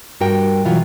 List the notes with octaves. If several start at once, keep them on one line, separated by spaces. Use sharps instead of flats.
G2 F#4 A#4 G5
B2 E3 F#3 F4